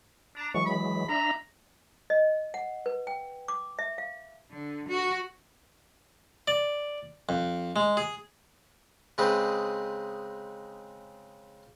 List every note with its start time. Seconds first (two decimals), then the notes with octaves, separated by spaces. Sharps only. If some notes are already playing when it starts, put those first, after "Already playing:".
0.37 D4 A#5
0.54 E3 F#3 G#3 C#6
0.66 B5
1.09 D4 E5 A#5 B5
2.10 D#5
2.54 F#5
2.86 B4
3.07 G5
3.48 D6
3.79 E5
3.98 F5
4.51 D3
4.88 F#4
6.48 D5
7.29 F2
7.76 G#3
7.97 G#4
9.18 C#3 G#3 C4 D#4 B4